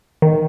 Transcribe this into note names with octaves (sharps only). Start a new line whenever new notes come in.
D#3